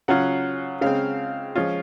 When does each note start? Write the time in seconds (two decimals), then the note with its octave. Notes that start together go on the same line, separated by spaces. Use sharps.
0.08 C#3 F#3 C#4 F4 F#5
0.81 C#3 G#3 C4 F5
1.56 F3 G#3 C#4 F4